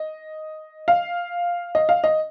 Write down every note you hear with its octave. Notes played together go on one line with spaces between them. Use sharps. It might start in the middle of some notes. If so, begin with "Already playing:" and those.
Already playing: D#5
F5
D#5
F5
D#5